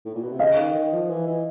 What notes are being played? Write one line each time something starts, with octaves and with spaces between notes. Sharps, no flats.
A2
A#2
B2
C3
C#3 D#5 F5
D#3
D#3
F3
E3
E3